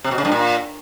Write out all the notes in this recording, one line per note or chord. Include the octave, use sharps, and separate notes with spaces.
C3
B2
C#3
G2
A#2